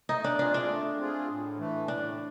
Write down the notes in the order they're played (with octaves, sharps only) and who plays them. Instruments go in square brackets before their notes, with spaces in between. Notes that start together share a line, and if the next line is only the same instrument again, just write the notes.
[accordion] A3 [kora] D#4
[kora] D4
[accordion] C4 F4 G#4 [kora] D4
[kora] D4
[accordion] A3
C4 F4 G#4
A2
E3 A3
[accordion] A2 [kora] D4